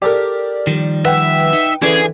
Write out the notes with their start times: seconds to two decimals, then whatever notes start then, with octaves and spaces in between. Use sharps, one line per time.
0.02 G4 A4 A#4 D5
0.67 D#3 F3 G3
1.05 B4 E5 F#5 G5
1.53 D#4
1.82 D3 E3 C#4 D4 G#4 D5